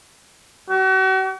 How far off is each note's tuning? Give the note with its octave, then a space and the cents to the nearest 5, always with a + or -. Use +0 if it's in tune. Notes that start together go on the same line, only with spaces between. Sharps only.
F#4 +40